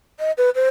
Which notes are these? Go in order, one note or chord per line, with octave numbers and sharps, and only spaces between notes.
D#5
B4
C5